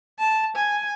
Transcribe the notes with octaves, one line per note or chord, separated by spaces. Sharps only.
A5
G#5